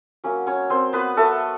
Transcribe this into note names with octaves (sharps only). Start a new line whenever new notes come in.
F#3 A#3 C#4
C#4 C#5
C4 C5
B3 B4
A3 A4